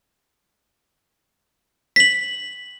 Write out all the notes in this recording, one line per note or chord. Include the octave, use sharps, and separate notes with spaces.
B6 F#7